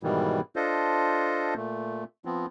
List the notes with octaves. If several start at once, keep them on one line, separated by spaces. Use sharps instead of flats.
G#2 B2 D#3 E3 G3
D4 F4 A4 C5 D#5
A#2 A3
F3 B3 C4